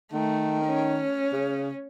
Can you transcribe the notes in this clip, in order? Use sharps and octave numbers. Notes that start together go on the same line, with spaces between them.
D#3 A3
C#4
C#3